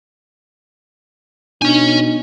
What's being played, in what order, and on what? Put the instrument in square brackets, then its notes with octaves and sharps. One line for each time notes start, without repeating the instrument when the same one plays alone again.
[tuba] B2 [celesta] D4 [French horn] D#4 [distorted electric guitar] C#5 G#5